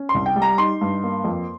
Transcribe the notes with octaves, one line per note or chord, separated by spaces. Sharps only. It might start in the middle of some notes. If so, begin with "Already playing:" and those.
Already playing: C#4
C6
C2
G5
G3
A#5
D#4 C6
G2
A#3
F2